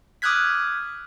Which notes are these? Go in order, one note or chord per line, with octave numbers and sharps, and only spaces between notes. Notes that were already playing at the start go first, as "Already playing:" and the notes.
D6 D#6 F6 F#6 G#6 B6